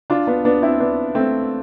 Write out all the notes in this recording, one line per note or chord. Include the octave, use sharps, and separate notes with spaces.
D4 F4
B3 D4
B3 D4
C4 E4
B3 D4
A3 C4